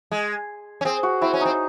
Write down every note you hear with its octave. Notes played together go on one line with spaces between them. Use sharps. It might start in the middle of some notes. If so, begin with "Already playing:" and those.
G#3
C#4
C4 G#4
F#4
C4 E4
C#4
C4 D#4